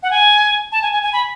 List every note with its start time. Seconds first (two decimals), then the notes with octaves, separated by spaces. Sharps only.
0.03 F#5
0.11 G#5
0.72 A5
0.82 G#5
0.92 G#5
1.03 G#5
1.13 B5